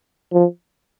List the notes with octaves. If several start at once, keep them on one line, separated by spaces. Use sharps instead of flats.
F3